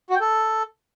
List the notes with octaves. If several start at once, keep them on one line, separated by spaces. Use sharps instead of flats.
F#4
G5
A4